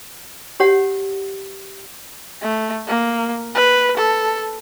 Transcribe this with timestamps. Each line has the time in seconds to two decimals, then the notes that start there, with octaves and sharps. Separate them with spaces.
0.60 G4 C#5 F#5
2.42 A3
2.88 A#3
3.55 B4
3.97 A4